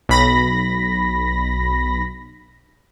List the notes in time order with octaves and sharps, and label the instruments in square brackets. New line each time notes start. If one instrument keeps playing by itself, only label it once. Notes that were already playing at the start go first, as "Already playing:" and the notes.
[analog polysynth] B1 B5 A#6